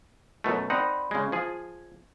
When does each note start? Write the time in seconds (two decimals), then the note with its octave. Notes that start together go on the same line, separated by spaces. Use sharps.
0.44 F#2 B2 A3
0.70 C4 D#4 D5 F#5 B5 C6
1.11 C#3 G#3 G#6
1.32 F3 G#4